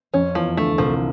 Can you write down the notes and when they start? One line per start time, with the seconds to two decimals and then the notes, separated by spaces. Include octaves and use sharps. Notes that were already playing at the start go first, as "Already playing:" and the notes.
0.14 F2 F3 C#4
0.35 E2 E3 F3
0.57 D2 D3 A3
0.78 C2 C3 F3